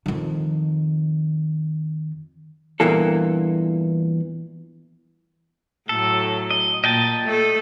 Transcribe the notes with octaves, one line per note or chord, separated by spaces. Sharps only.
F2 D#3
E2 G2 A#2 E3 A#3 A4
A2 F#3 A4
D#5
A#2 D#5 G5 A5
A3 A4